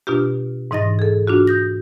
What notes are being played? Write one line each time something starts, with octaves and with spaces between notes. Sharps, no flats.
B2 D4 F4 G4
G#2 E3 D#4 D#5 A6 A#6
G#4 A4
D4 F4 F#4
D#6 G6 A#6